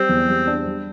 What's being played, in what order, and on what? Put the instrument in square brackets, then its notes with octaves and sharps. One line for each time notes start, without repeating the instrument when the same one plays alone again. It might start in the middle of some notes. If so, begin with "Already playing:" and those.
Already playing: [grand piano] G3 [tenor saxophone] C4
[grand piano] E2
G3
D4
G3